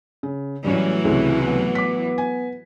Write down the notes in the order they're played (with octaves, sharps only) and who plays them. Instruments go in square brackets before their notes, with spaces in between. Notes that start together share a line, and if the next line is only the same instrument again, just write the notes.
[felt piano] C#3
[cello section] A2 E3 F#3 [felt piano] G3 C#4
[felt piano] C#2 C3 [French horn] E4
[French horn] B3
[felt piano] D6 B6
G#5